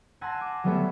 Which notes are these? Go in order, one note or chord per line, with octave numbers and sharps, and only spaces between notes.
F#5 G#5 A5 C6 E6 A#6
D6
F#3 G3 A3 B3 A4 E5